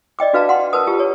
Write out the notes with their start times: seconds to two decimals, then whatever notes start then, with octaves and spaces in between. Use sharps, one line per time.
0.19 D5 D#5 G5 D6
0.33 D4 F#4 B4 F5 A5 A#5
0.49 F#5 C6
0.73 A#4 B4 A5 D#6
0.87 F4 G4 A5
1.00 C#5